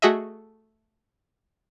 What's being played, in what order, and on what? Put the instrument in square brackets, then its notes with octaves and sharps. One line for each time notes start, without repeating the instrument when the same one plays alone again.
[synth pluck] A3 F#4 G#4 D#5 E5